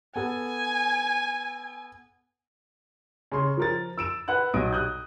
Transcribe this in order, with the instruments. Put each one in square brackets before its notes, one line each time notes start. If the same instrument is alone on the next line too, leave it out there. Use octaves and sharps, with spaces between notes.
[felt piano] B3 A4 [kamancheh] G#5
[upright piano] C#3 C#5 C6
F3 A#4 A6
E6 D7 E7
B4 F#5 F#6
B1 D#6 D7
D#6 F#6 G6